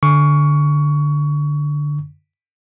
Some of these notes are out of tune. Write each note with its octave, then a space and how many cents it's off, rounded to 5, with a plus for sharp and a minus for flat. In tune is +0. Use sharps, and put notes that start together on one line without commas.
D3 +0 C#6 +20